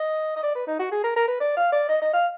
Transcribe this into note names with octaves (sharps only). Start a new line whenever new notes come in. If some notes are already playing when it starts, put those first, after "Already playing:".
Already playing: D#5
D#5
D5
B4
D#4
F#4
G#4
A#4
A#4
B4
D5
F5
D5
D#5
D#5
F5